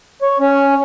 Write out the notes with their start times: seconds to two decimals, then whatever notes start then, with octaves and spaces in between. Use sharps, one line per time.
0.22 C#5
0.40 C#4